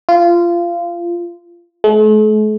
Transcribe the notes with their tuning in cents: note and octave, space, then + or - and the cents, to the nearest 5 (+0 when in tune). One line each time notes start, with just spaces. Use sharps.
F4 -20
A3 -45